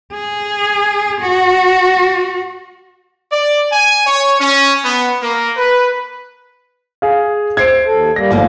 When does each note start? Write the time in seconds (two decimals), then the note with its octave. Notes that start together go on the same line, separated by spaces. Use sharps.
0.13 G#4
1.21 F#4
3.31 D5
3.72 G#5
4.06 C#5
4.39 C#4
4.84 B3
5.21 A#3
5.56 B4
7.02 G#4 F5
7.57 C5 E5 G#6 C7 D7
7.86 D#2 A4
8.16 G3 A#3 A#6
8.31 G1 G#2 F3 A#3 E4